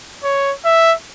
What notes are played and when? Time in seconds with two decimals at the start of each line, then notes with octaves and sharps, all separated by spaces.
0.24 C#5
0.65 E5